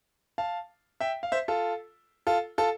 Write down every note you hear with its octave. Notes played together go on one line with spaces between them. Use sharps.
F5 A5
E5 G5
F5
C5 E5
F4 A4
F4 A4
F4 A4